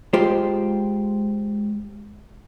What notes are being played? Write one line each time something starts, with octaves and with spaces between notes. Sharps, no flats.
G#3 F4 G4 C5